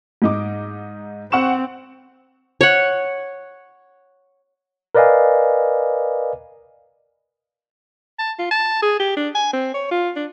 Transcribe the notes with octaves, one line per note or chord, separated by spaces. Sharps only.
G#2 D#4 D6
C4 F#5 C#6 E7
C#5 F#5
A#4 B4 D5 D#5 F5 G#5
A5
F4
A5
G#4
G4
D4
G#5
C4
C#5
F4
D4